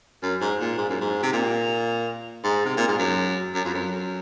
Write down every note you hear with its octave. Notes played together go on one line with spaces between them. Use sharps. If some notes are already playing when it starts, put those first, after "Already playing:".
F#2
G#2
A#2
G#2
F#2
G#2
C3
A#2
G#2
C3
A#2
G#2
F#2
F#2
F2
F#2